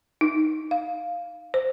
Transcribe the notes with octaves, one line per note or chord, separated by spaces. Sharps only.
D#4
F5
C5